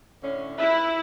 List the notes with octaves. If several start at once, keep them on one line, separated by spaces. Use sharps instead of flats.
A2 D3 C#4
E4 B4 E5